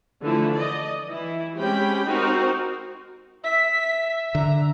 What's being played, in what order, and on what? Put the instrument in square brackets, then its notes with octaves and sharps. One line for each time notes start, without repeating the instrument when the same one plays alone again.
[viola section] D3 E3 F3 A3 E4
D5 D#5
E3 E4
G#3 C4 C#4 G4 G5 B5
C4 D#4 F#4 A#4
[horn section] E5 [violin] B6
[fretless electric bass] D3 [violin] A#5